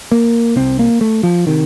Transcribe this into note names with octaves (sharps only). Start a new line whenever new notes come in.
A#3
C2 C3 C4
A#3
A3
F3
C3 D#3